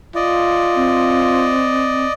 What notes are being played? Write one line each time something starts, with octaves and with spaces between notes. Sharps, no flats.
F4 D5 D#5
C4